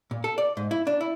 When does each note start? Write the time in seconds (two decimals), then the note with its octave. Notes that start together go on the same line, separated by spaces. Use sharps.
0.11 A#2
0.24 A4
0.38 D5
0.57 G#2
0.71 E4
0.87 D4
1.01 E4